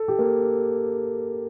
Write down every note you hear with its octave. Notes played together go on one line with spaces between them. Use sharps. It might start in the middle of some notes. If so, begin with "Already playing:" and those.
Already playing: A4
G4
A#3